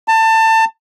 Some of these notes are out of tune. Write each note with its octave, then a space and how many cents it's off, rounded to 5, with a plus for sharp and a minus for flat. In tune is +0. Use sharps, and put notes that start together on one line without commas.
A5 +25